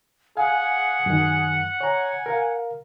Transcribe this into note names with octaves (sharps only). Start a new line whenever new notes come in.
G#4 F5 F#5 G#5
F#2 D#3
C#5 G#5 A#5
A#4 F5